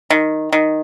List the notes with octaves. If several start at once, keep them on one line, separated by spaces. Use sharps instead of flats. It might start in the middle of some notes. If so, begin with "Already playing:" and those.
D#3
D#3